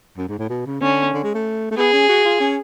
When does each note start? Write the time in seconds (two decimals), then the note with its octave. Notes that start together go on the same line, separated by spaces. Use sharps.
0.17 F#2
0.29 G#2
0.39 A2
0.50 B2
0.66 C#3
0.81 D3 C#4
1.14 D3
1.24 G#3
1.34 A3
1.71 A3
1.77 B3 G#4
1.93 C#4
2.09 F#4
2.25 F4
2.40 C#4